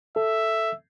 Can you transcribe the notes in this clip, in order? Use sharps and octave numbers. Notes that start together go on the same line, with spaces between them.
A4 E5